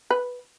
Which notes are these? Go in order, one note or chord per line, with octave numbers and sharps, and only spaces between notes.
B4